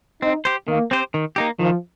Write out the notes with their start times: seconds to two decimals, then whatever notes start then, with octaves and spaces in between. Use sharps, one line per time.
0.22 C4 D#4
0.45 G4 C5
0.68 D#3 A#3
0.91 C4 G4 C5
1.14 D#3
1.36 A#3 D#4 G4
1.59 D#3 F3